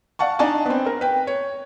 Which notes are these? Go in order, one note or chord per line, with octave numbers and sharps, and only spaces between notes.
D5 F5 F#5 A5 C#6
D4 D#4 D5 G#5 A5
B3 C4
A#4
B4 G5
C#5